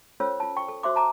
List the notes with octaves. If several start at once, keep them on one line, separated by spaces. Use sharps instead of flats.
C#4 F4 A4 C5 C#5 E6
F4 A5
G5 C#6
A4
F#4 C5 E5 C6 D6
A5 A#5 D6